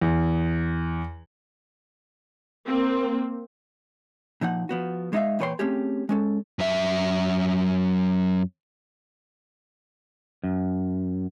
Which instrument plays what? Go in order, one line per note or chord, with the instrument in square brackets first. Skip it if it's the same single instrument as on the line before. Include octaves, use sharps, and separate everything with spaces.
[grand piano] E2
[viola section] A#3 C4
[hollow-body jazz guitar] A#2 F3 D#4 F#5
F3 B3 F#4
G#3 D#4 F4 E5 F5
E2 A#2 B4 C#5 G5 C6
A3 C4 C#4 G4 G#4
G#3 C#4 A4
[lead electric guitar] F#2 E5
[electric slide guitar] F#2